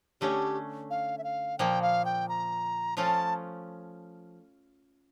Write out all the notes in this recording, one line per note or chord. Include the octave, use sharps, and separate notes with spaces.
D3 A3 C#4 G4
F5
E5
F5
A#2 F3 A#3 G5
F5
G5
A#5
F3 A3 C#4 F4 A5